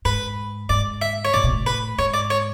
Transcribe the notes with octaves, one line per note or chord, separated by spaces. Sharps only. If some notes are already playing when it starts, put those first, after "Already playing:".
G#2 B4
G#2 D5
E5
C#5
A2 D5
B2
A2
B4
G#2 C#5
D5
C#5